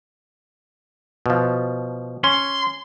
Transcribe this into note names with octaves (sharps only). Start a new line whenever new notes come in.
B2 F3
C#4 C6